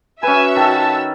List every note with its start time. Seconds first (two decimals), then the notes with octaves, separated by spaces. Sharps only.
0.23 C#4 F#4 B4 E5 G#5 E6
0.56 D#3 A4 A5